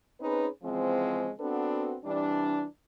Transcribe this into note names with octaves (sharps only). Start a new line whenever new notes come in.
C4 C#4 D#4 G#4 B4
C#3 E3 F3 G#3 C4
B3 C4 D4 F#4 A4 B4
C3 E3 G3 D4